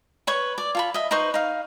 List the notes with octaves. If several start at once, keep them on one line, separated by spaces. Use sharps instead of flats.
B4 C#5 C#6
D5
F4 A4 B5
D#5 E5
D#4 B4 C5 C#6
D#4 F5